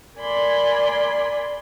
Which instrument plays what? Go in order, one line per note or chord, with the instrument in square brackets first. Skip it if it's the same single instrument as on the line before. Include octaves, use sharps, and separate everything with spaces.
[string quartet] A#4 D5 G#5 B5 C6